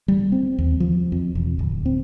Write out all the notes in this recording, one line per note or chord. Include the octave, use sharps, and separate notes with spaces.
G3
C4
D#2
F3
F2
E1
D1
C4